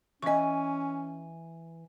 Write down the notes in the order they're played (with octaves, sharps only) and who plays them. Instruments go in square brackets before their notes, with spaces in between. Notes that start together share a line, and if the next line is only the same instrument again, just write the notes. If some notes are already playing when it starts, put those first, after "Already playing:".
[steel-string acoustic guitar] E3 G#5 [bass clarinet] C#4 [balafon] D#5 C#6